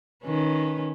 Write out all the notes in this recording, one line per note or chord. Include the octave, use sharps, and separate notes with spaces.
D#3 C#4 B4